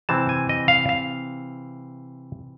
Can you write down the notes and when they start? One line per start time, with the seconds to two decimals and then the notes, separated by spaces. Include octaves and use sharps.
0.09 C3 E3 G#3 C4 A5
0.29 G#5
0.49 D#5
0.68 F5
0.89 F5